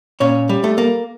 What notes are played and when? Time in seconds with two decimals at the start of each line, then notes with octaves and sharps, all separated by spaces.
0.20 A#2 C#4 C#5
0.49 G3
0.64 A3 A4
0.78 A#3